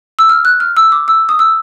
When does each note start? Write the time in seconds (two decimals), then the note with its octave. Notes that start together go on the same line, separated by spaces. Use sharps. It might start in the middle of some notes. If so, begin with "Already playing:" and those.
0.19 E6
0.29 F6
0.45 F#6
0.60 F6
0.77 E6
0.92 D6
1.08 E6
1.29 D#6
1.39 E6